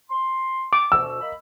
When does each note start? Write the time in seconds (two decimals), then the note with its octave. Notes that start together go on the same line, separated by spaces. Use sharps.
0.10 C6
0.73 D6
0.92 D2 B2 E6
1.21 A#3 D#5 B5